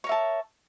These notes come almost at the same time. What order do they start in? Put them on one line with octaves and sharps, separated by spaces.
C#5 A#4 E5 A5